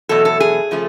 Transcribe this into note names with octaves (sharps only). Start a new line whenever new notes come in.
E2 B2 F#3 A3 A4
A4
G#4
C#3 F3 A3